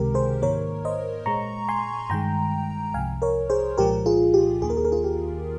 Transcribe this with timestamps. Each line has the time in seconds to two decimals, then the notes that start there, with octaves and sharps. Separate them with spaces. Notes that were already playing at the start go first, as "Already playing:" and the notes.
Already playing: C#2 C3 D#3 G#3 G4 A#4
0.14 G#4 C5
0.42 G#2 D#3 A#3 A#4 C#5
0.85 C5 D#5
1.26 A#2 G#3 A#5 C#6
1.69 G#5 C6
2.10 G2 D#3 G#3 G5 A#5
2.94 C2 C3 F3 F5 G#5
3.22 A#4 C#5
3.50 G#4 C5
3.78 C2 A#2 F3 G#3 G4 A#4
4.06 F4 G#4
4.34 G4
4.62 D#2 D#3 A#3 G#4
4.70 A#4
4.77 G#4
4.85 A#4
4.92 F4 G#4
5.04 G4